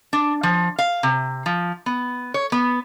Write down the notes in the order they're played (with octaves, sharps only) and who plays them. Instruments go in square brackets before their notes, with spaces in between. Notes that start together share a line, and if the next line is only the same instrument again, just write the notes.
[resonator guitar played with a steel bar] D4
F3
F5
C3
F3
B3
C#5
B3